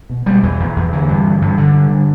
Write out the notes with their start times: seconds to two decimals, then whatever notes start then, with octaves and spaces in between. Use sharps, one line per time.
0.10 B2
0.26 B2 G3
0.43 E2 E3
0.60 E2
0.76 E2
0.93 D3 E3
1.08 G2
1.25 D3
1.42 G2
1.58 G2 D3
1.74 G2
1.90 D3